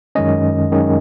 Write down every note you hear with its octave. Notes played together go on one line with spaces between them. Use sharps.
F#2 D#3 G#3 C#4 D#5
F#2 D#3 G#3 C#4